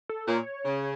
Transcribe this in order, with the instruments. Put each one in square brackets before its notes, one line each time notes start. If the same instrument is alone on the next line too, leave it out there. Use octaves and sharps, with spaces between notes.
[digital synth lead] A4
[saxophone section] A#2 [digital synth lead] C#5
[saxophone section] C#3